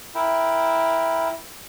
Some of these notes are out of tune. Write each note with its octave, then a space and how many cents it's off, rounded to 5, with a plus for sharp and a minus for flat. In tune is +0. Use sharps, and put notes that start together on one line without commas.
E4 +0 A#4 +0 G5 +0